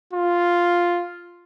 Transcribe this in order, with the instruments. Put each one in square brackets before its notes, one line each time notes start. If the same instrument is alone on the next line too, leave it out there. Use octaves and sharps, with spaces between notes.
[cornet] F4